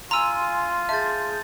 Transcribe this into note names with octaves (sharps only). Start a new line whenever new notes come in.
F4 G#5 A#5 C6 E6 D#7
G#4 E5 A5 G6 A6